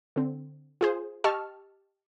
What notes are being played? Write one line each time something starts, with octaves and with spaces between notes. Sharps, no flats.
D3 C4
F4 G#4 C5
G4 D#5 A5 C#6 E6 F6